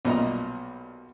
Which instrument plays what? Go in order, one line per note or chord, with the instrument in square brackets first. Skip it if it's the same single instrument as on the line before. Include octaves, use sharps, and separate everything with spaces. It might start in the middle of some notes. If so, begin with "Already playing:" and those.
[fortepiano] B1 A#2 G3 D#5 A#5